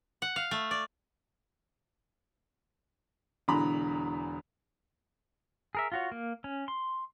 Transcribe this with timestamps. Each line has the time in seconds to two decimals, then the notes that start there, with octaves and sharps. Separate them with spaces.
0.22 F#5
0.36 F5
0.51 A3
0.71 D5
3.48 E1 E2 D3 A#5 B5
5.75 G#4 A#4 E5
5.92 F4 F#4 C#5
6.12 A#3
6.44 C#4
6.68 C6